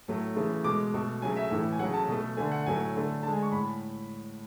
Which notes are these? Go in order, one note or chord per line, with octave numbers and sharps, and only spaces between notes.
A2 F#3 A3
C#3 E3 A3
B2 G#3 D6
B2 A3
C#3 F#3 A3 G#5
E5
A2 E3 A3
G#5
C#3 F#3 A3 F#5
A5
B2 A3
D3 A3 G#5
F#5
A2 F#3 A3 G#5
D3 A3
D3 G#3 A5
G#5
C#6
A2 B5